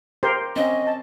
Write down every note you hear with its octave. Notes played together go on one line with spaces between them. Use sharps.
G4 A#4 C5
C4 C#4 D#5
A5